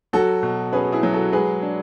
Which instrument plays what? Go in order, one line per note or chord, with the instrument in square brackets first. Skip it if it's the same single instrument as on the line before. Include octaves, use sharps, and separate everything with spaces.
[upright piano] F#3 [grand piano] F#4 A4
[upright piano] B2
[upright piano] C#4 [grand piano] G#4 B4
[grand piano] E4 G#4
[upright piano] F#3
[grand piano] F#4 A4
[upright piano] G#3 [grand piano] G#4 B4
[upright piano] D4